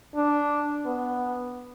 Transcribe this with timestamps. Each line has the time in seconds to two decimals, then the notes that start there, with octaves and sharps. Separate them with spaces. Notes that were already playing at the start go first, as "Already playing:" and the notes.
0.15 D4
0.86 B3